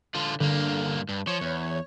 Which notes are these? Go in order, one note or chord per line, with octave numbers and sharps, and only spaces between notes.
D3 F4
G2 D3 A#3
G2
F3 C#5
E2